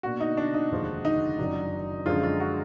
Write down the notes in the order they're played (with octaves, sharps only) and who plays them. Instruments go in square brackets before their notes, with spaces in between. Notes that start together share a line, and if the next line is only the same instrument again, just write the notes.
[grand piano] B2 A#3 D4 [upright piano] F#4
[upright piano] D#4
D4
D#4
[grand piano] F1 D#2 D3 F3 G#3
[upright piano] D#4
[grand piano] F#1 F#2 D#3 F#3 D4
[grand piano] F#2 D3 F3 G#3 [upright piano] F4
[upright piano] F4
F#4